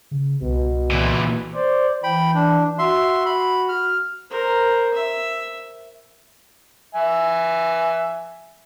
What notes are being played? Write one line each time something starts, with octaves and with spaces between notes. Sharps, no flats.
C#3
C2 B2
A#2 E3
C5 D5
E3 G5 B5
D4
F#4 E5 C6
B5
F6
A#4 C5
E5
E5 G#5